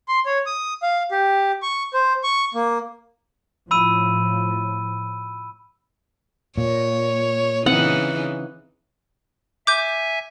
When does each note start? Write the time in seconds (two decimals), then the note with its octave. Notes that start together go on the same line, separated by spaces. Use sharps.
0.08 C6
0.26 C#5
0.46 D#6
0.83 F5
1.11 G4
1.62 C#6
1.94 C5
2.24 C#6
2.54 A#3
3.71 A2 F3 B5 E6 D#7
6.58 A#2 C#5
7.66 C#3 E3 C4 D#4 F#5
9.67 E5 G#5 D6 G6